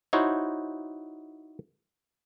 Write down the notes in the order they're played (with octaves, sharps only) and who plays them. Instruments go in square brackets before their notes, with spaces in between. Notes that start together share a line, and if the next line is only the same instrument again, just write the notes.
[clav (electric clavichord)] D#4 E4 F#4 C5 C#5